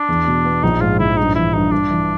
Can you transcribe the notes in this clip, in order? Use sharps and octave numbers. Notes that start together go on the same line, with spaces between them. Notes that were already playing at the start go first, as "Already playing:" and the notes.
Already playing: D4
E2
B2
B3
A#1 D#4
G#2 F4
A#1 E4
G2 D#4
E3 E4
G2 D#4
G2 D4
E3